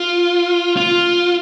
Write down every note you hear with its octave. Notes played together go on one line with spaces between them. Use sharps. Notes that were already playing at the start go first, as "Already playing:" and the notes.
Already playing: F4
F4